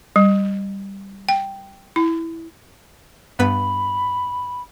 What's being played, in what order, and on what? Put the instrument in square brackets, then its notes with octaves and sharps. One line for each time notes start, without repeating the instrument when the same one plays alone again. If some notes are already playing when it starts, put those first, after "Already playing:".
[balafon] G3
G5
E4
[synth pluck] G2 B3 B4 [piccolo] B5